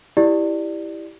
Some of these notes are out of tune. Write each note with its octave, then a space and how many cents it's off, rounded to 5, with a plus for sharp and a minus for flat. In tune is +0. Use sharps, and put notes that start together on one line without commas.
E4 +0 G4 +0 D5 +10